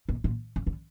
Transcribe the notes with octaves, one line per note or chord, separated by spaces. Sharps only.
B2
A#2
C#3
D3